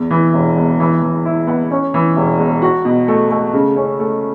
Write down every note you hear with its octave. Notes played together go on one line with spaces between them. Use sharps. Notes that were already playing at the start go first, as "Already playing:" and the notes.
Already playing: E2
E3
E1
E2
E3
E3
E4
B3
C#4
E3
E1
E2
F#4
B2
A3
A3
C#3
C#4
A3